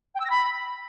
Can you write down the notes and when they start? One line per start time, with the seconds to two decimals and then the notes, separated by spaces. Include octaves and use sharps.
0.14 G5
0.19 E6
0.24 A#6
0.30 B5